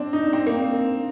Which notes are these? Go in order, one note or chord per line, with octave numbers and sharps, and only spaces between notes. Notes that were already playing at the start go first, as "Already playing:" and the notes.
Already playing: C4 D4
D#4
C4
A#3